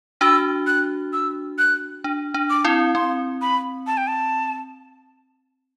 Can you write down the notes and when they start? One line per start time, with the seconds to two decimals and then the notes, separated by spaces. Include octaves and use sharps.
0.21 D4 F#4 E6
0.67 F#6
1.13 E6
1.58 F#6
2.04 D4
2.34 D4
2.50 D6
2.64 C4 E4
2.95 C4 C6
3.42 B5
3.87 A5
3.97 G5
4.07 A5